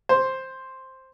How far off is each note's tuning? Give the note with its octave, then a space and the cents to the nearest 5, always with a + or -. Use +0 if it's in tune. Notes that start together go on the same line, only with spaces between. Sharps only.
C5 +5